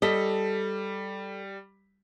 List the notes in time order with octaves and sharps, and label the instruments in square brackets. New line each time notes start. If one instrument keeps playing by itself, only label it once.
[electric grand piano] G3 B6 [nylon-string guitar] A4 D#5